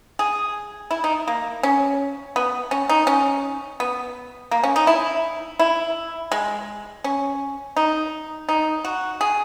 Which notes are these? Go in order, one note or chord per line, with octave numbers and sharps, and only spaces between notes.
G#4
E4
D#4
A#3
C#4
B3
C#4
D#4
C#4
B3
A#3
C#4
D#4
E4
E4
G#3
C#4
D#4
D#4
F#4
G#4